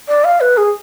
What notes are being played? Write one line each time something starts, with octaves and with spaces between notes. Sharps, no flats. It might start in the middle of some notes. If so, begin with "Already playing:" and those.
D5
F5
B4
G#4